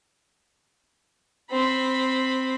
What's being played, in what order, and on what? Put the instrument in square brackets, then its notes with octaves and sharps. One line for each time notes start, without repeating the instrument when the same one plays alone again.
[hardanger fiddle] C4 B5